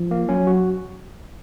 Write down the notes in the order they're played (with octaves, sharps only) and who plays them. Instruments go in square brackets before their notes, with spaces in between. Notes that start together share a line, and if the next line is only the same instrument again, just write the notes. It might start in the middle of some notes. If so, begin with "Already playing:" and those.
Already playing: [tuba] F3
[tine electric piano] A#3
[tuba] F#3 [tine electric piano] C#4
[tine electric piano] F#4